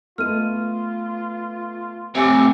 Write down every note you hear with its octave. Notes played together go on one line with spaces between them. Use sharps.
A3 B3 F4 D#5 F6 D#7
A2 C3 G4 E5 G5 G#5 D6